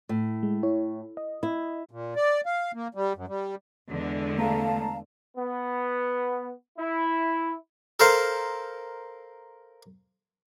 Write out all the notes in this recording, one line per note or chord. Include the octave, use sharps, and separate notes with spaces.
A2
G#3
E4 C#5
D#5
E4
A#2
D5
F5
A#3
G3
F#2
G3
E2 D3 G#3
A3 F5 A5 A#5
B3
E4
A4 A#4 C5 F5